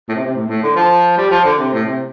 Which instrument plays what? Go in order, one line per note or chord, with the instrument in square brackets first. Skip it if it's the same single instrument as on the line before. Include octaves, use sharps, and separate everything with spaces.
[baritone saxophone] A2
C3
C3
A2
A2
D3
F3
G3
F3
D3
C3
A2
C3